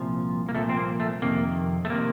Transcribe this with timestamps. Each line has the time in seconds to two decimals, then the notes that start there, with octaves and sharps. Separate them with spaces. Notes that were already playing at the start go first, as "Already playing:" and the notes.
Already playing: C2 A#2 F3
0.49 A#3
0.54 C2 A#2 F3 A3
0.69 C4
0.77 A#3
1.00 A3
1.22 F2 C3 D#3 A#3
1.85 A3
1.90 C3 D#3 A#3